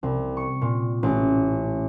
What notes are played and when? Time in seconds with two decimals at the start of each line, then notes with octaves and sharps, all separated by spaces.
0.03 C2
0.37 C#6
0.61 A#2
1.03 A1